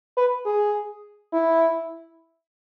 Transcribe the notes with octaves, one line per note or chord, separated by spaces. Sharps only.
B4
G#4
E4